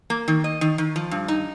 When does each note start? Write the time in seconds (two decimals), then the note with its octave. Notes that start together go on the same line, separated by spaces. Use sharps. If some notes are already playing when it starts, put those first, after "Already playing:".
0.10 A#3
0.28 D#3
0.44 D#5
0.61 D#3
0.78 D#3
0.96 F3
1.11 G2
1.28 D#4